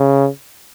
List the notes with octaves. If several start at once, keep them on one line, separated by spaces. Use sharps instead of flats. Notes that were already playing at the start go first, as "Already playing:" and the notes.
Already playing: C#3